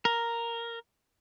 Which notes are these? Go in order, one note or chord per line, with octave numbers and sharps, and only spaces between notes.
A#4